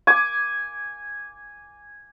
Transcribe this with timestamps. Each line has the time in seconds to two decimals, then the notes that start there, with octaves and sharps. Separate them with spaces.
0.07 G#5 D6